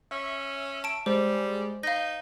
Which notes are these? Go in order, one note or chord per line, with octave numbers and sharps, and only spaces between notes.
C#4 E5
A5 D7
G3 G#3 C5
D#4 F5 G6 A#6